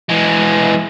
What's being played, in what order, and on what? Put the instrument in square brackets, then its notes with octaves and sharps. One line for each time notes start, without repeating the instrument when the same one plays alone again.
[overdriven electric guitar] E3 G#3